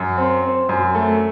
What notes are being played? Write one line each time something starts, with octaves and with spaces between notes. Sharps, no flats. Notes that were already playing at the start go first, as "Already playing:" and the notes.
Already playing: F#2
C4
C4
F#2
A3